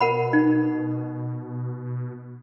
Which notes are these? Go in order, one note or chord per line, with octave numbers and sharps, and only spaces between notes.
B2 A#4 F#5 B5
D#4